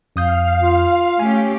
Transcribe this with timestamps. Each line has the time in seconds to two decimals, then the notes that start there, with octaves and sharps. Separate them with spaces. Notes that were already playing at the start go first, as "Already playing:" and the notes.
0.16 F2 F5 D#6 G6
0.62 F4
1.19 A3 C#4 G4 G#5